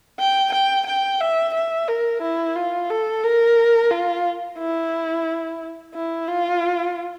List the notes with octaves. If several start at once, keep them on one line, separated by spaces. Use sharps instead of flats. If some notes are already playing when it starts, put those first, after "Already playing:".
G5
G5
G5
E5
E5
A#4
E4
F4
A4
A#4
F4
E4
E4
F4